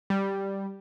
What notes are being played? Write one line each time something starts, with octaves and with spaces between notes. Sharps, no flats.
G3